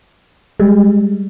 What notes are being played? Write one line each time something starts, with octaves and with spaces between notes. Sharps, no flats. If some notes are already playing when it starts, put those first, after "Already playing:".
G3 G#3